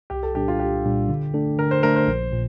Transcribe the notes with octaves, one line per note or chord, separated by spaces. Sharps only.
C2 G4
A4
A#2 G3 D4 G4
F4
C2 G4
A#2 G3 D4
D3
A3 D4 A4
D3 A#4
C5
A3 D4 A4 A#4
C5
A#1
A#2